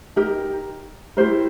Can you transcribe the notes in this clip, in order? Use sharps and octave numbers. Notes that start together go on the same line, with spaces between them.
D#4 G4 A#4
E4 G4 A#4 C5